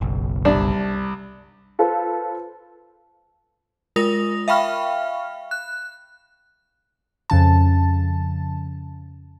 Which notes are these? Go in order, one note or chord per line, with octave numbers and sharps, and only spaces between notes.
F#1 B1
C2 D4
F4 A4 B4 C5
G#3 F4 A#4 D#6 A#6 F7
E5 F5 G5 B5 C#6 F6
F#6
F2 C#3 A5